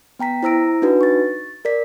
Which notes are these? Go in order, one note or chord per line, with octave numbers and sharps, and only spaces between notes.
B3 G5 A#5 B6
E4 C5 A#5 E6 A#6 D7
D4 D#4 F#4 B4
C#6 A6
A#4 D5 B6